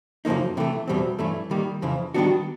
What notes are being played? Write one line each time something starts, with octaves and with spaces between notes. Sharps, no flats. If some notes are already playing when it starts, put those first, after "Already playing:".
F#2 C#3 F3 A#3 D#4
C3 E3 A3
E2 B2 G3 C4
G2 E3 A3 C#4
D#3 G3 A#3
F2 C#3 E3
D#3 G3 B3 D4 F#4